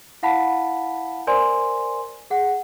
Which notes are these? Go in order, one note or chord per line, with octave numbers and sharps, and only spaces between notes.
E4 F5 F#5 A5 B5 B6
A#4 C5 D5 G#5 C6
G#4 F#5